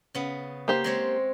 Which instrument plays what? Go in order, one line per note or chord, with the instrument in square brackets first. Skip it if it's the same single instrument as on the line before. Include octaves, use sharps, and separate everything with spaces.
[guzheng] C#3 B3
[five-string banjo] A#3 G4 C5
[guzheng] G#3 C4 C#5